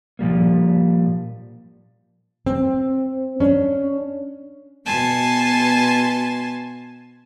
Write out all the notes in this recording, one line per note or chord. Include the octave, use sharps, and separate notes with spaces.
A#2 F3 G3 A#3
C4
C#4 D4
B2 B3 G#5 A5 C6